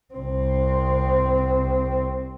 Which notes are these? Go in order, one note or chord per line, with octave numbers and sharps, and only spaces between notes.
C2 C4